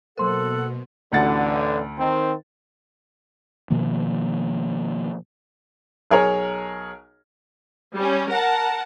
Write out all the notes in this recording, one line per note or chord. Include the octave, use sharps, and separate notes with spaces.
B2 F#3 A#3 A4 A#4 C5 F#5 C6
A1 D2 D3 F#5 A6
D#3 C4
B2 D#3 F3 A#3
B1 G#4 A#4 C#5
G3 C#4
A#4 F#5 A5